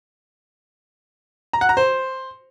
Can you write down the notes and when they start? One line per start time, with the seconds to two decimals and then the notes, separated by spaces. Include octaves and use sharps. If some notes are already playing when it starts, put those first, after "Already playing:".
1.53 A#5
1.61 F#5
1.69 A#5
1.77 C5